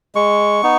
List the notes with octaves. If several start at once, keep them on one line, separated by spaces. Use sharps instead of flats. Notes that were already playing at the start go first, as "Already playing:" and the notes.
G#3 C#6
B3 D#4